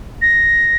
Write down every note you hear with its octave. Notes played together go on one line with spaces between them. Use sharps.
A#6